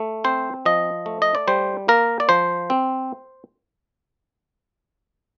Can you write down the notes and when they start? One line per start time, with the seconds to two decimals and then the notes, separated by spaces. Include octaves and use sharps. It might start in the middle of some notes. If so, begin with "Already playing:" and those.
Already playing: A3
0.24 C4 C5
0.65 F3 D#5
1.06 A3
1.22 D#5
1.35 D5
1.47 G3 C5
1.88 A#3 A#4
2.20 D5
2.29 F3 C5
2.70 C4